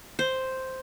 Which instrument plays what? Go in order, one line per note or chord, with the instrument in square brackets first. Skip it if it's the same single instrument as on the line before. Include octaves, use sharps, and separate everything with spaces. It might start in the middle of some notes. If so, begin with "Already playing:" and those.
[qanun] C5